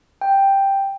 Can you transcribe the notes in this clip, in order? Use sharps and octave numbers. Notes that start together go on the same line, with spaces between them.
G5